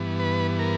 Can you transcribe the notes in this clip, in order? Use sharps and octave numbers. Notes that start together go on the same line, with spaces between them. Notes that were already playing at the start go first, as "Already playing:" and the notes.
Already playing: G2 E3 B3
B4
A#4